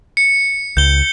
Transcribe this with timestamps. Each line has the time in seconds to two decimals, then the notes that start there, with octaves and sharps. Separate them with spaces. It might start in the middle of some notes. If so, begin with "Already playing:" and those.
0.17 C#7
0.77 C#2 G6 G7